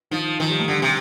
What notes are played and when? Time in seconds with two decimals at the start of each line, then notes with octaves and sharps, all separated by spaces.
0.11 D#3 F3
0.40 D#3 F3
0.50 G3
0.59 A3
0.68 D3 G3
0.82 C3